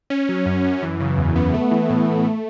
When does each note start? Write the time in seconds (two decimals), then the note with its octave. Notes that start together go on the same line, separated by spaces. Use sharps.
0.10 C#4
0.29 F#3
0.46 F#2
0.65 F#2
0.83 E3
1.00 C#3
1.18 E2
1.36 B3
1.54 A3
1.71 E3
1.90 A2
2.07 A2
2.25 A3